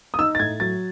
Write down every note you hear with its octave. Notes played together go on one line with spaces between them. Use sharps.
D#6
D#4 E6
A6
A2 G#6
F#3 A6